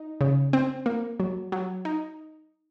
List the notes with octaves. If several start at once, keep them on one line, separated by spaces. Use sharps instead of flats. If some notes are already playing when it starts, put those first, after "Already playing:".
Already playing: D#4
C#3
C4
A#3
F#3
F#3
D#4